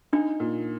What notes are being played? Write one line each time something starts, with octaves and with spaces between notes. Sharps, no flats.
D4 D#4
A#2